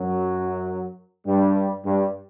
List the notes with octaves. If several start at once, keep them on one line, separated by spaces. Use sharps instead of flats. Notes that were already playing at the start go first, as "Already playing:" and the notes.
Already playing: F#2 F#3
G2 G3
G2 G3